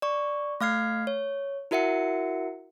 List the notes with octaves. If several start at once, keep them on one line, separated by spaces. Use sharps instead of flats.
D5 C#6
A3 F5 F6 G#6 C7
C#5
E4 F#4 A#4 E5 F#5 C#7